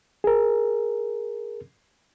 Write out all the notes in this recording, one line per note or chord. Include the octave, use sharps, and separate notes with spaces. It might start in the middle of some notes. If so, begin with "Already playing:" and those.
G#4 A#4